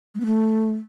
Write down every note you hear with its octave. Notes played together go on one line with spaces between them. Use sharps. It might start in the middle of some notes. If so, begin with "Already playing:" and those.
G#3
B3
A3